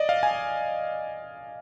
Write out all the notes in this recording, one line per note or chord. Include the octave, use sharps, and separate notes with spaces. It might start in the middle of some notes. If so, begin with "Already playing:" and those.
Already playing: D5 D#5
F5
G#5